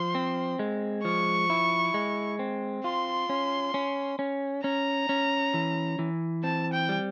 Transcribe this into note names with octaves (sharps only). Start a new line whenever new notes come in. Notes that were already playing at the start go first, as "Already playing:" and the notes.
Already playing: F3 C6
C4
G#3
F3 C#6
E4
G#3
C4
F4 C6
C#4
C#4
C#4
C#4 A#5
C#4
E3
E3
C4 A5
G5
G3